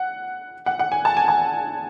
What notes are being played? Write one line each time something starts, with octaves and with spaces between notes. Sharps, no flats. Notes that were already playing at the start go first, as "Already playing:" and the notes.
Already playing: F#5
F#5
F#5
G#5
A5
G#5
A5